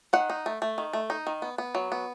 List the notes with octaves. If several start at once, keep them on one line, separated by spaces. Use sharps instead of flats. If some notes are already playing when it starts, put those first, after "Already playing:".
D#3 F#5
D#4
A3
A3
D#3
A3
D#4
D#3
B3
B3
F#3
B3